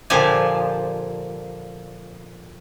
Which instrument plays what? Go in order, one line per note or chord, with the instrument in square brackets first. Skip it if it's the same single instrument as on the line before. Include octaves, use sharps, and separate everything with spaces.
[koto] A#2 D3 F3 G4 D5 G#5